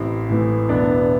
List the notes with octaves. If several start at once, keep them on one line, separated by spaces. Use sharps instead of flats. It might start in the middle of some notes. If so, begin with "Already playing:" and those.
Already playing: A1 C4 E4
A2 E3
E1 B3 D4